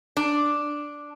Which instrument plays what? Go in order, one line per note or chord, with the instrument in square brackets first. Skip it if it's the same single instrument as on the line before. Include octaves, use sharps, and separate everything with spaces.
[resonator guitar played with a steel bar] D4